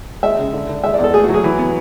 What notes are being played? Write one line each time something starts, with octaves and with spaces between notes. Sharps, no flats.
G#3 E5
C#3
D3
D3
G#3 E5
D5
E2
A4
A3 G#4
F#4
F#3 G#4
E3
B3